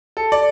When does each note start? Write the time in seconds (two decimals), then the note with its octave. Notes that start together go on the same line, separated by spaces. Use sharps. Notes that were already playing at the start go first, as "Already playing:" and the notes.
0.17 A4
0.32 D5